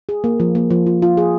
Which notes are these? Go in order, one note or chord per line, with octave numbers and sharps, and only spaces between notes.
G#4
A#3
F3
A#3
F3
F4
F4
G#4